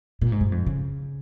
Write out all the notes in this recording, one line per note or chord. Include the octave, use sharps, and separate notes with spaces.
A#2
G#2
G2
F2
C#3